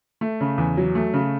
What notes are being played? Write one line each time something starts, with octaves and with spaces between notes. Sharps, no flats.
A3
C#3
E2
F#3
A3
C#3